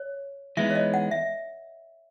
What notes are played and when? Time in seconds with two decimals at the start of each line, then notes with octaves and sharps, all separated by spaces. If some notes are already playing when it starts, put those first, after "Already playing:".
Already playing: C#5
0.57 E3 G#3 B3 D#4 E5
0.70 C#5
0.75 D#5
0.94 F#5
1.11 E5